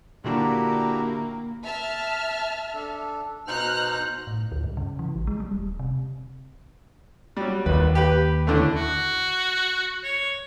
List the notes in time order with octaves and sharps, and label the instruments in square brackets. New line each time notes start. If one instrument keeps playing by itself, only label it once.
[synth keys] A#2 D3 D4 [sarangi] A#3 [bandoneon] E4 F#4 G4
[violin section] E5 A5 F6
[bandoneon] D4 A4
[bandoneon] B2 D#4 C5 [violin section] A#5 F6 F#6
[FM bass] A2
D2
G2
C#3
E3
A#1
G#3
G3
D#1
C3
[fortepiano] F#3 G3
[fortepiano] A#1 B4 [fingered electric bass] D#2
[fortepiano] G4 B4
A2 D3 A3
[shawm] F#4
C#5